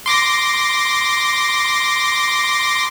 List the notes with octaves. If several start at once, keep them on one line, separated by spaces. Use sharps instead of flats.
C6 D6 A#6